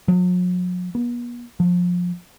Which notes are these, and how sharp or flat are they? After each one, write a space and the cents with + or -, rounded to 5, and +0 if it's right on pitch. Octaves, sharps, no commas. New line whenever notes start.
F#3 -45
B3 -45
F3 +25